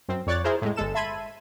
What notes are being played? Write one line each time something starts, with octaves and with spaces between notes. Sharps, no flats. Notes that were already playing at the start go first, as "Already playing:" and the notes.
F#2 C4
F2 C#5 D5 F#6 A6
E4 G#4 A#4 C5
A2 G#3
G1 G#3 A4 E7
E5 A5 B5 C6 G#6 D#7